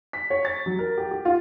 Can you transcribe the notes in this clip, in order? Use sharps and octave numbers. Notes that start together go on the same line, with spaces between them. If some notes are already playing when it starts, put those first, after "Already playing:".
B6
C#5
A6
F#3
A#4
G4
G4
F4